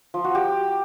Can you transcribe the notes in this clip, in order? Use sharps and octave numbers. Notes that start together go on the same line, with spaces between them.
F3
F#4
G4